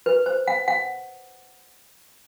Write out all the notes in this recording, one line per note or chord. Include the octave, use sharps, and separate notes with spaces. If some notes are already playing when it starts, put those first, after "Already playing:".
B4
C5
F#5
F#5